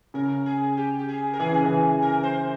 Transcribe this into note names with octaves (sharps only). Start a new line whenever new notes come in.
C#3 A#4
G#4
G4
G4
G#4
A#4
E3 G#4
C#3
E3
A#4
C5